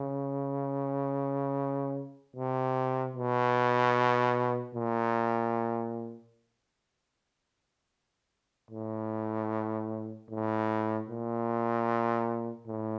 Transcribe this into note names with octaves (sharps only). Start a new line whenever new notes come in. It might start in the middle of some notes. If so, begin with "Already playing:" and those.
Already playing: C#3
C3
B2
A#2
A2
A2
A#2
A2